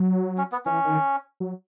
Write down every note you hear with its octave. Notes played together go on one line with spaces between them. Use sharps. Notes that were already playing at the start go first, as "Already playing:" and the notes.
Already playing: F#3
C#4
B3
E3 C#4
D#3
F#3